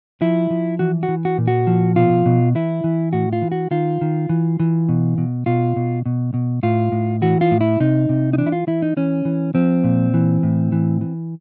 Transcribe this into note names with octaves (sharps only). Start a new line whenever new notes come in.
F3 E4
F3
E3 F#4
F#4
E3
F#4
A#2
F#4
F3
B2 F4
B2
E3 E4
E3
A2 F#4
F4
E3
F#4
D#3 F4
D#3
E3
E3
B2
B2
B2 F4
B2
B2
B2
A2 F4
A2
E3 F#4
F4
A2
E4
C3 D#4
C3
D#4
E3 D4
E4
F4
E3 E4
D#4
E3 C#4
E3
F3 C4
A#2
E3
A2
E3
E3